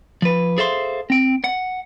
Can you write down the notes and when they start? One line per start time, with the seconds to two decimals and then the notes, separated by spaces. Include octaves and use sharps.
0.22 F3 B4
0.58 G#4 A4 C5 E5 F5 C6
1.10 C4 G5
1.44 F#5